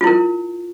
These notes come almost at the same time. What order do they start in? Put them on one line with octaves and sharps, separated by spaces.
F4 E4 A#4